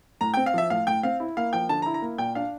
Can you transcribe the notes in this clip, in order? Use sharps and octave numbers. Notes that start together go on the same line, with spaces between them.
A2 A#5
C4 G5
F5
F3 E5
A2 F5
A2 G5
C4 F5
E4
A#3 F5
F3 G5
D3 A5
A#5
E4
A#5
A#3
A#2 G5
D4 F5